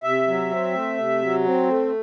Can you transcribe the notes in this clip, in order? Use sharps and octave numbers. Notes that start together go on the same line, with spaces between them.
C3 E5
F#3
C4
A3
C3
F#3
C4
A3